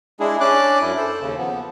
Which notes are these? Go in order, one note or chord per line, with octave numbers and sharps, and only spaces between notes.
G#3 D4 E4 G#4
C#4 D4 D5 D6 F#6
F#2 E4
A4 C5
D#2 C#3
F3 B3